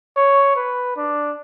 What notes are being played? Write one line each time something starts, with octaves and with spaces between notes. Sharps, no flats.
C#5
B4
D4